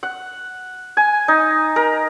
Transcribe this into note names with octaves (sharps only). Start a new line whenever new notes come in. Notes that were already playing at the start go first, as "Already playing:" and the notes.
F#5
G#5
D#4
A#4